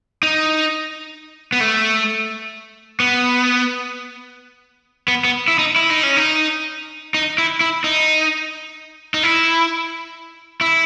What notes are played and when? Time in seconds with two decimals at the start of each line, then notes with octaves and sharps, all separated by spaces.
0.23 D#4
1.52 B3
1.61 A3
3.00 B3
5.08 B3
5.24 B3
5.48 E4
5.59 D#4
5.76 E4
5.90 D#4
6.03 C#4
6.17 D#4
7.14 D#4
7.38 E4
7.61 E4
7.84 D#4
9.14 D#4
9.23 E4
10.61 E4